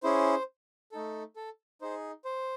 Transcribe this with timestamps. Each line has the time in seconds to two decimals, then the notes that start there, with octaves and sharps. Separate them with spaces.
0.03 C#4 E4 G#4 C5
0.92 A3 D#4 A4
1.36 A4
1.81 D#4 G#4 C5
2.25 C5